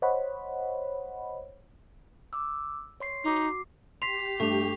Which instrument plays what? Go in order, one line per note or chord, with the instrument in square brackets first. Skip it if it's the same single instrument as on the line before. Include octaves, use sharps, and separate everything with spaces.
[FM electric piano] C5 C#5 D#5 F#5 B5
[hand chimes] D6 E6
C#5 C6 C7
[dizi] D#4 [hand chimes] F#4 D6 C7
[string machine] G4 [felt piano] C6 [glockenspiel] B6 C7 F7
[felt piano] G2 [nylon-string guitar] A3 [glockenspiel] C#6 F7